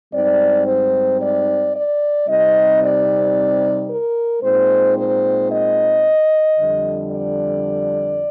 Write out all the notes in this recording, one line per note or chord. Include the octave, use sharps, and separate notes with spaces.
G#2 G3 C4 D#4 D5
C5
D5
D5
C3 G3 C4 D#4 D#5
D5
A#4
A#2 G#3 C4 D#4 C5
C5
D#5
F2 D3 G3
D5